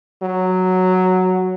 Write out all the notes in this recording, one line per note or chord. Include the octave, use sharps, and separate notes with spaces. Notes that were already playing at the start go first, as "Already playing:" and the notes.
F#3